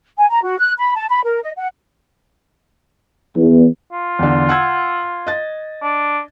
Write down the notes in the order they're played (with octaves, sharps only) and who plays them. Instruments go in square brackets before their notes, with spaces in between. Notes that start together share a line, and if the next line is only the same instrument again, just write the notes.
[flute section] G#5
A#5
F#4
F#6
B5
A5
B5
A#4
D#5
F#5
[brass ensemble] E2
[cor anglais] F4
[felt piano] E2 D3
F#5 E6 G#6
D#5 A6
[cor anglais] D4